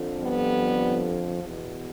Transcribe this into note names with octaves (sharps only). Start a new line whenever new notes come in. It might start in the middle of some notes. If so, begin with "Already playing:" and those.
Already playing: F2 D3 F3
G3 B3
E2 B2